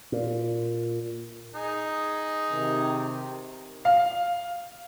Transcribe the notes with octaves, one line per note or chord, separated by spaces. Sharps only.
A#2
D#4 G#4
C3 D#3
F5